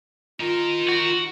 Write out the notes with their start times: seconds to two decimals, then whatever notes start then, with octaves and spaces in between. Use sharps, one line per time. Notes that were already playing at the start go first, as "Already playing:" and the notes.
0.40 D#4 F4 A#4
0.89 F#4